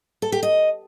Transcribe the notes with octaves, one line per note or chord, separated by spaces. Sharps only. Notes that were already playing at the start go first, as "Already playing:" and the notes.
A4
G4
D#5